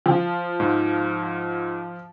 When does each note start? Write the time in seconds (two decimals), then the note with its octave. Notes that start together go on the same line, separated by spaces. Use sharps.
0.06 F3
0.60 G#2